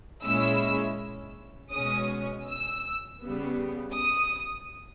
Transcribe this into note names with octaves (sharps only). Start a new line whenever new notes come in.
A#2 G#3 C#4 E4 E6
B2 G#3 C#4 D#6
E6
C#3 G3 B3
D#6